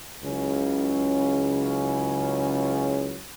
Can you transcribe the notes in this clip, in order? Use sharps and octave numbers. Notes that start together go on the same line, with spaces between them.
C#2 C#3 F#3 C#4 E4